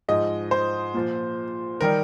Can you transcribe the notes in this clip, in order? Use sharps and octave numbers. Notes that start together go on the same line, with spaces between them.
G#2 F3 D#5
C5
A#2 F3
D#3 G3 A#4